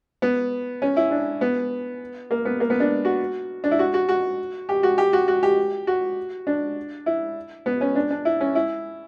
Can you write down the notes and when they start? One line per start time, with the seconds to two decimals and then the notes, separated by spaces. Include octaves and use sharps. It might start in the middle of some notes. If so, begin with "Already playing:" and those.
0.22 B3
0.82 C#4
0.97 E4
1.11 D4
1.41 B3
2.31 A#3
2.45 B3
2.60 A#3
2.70 B3
2.80 D4
3.05 F#4
3.64 D4
3.71 E4
3.79 F#4
3.94 F#4
4.09 F#4
4.69 G4
4.83 F#4
4.98 G4
5.13 F#4
5.28 F#4
5.43 G4
5.87 F#4
6.47 D4
7.06 E4
7.66 B3
7.81 C#4
7.95 D4
8.11 D4
8.25 E4
8.40 C#4
8.55 E4